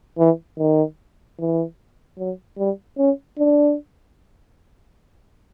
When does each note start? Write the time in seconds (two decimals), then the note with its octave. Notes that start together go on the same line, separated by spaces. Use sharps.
0.19 E3
0.59 D#3
1.39 E3
2.19 F#3
2.58 G3
2.98 C#4
3.38 D4